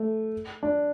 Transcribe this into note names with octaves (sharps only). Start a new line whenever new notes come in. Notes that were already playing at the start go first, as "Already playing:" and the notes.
Already playing: A3
D4